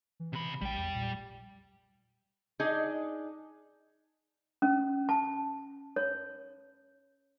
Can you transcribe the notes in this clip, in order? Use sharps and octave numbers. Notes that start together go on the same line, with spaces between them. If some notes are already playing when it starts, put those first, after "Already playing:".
E3
C3 B5
A#1 G3 G5
E2
A#2
D4 D#4 G#4 D#5
C#4
A5
C#5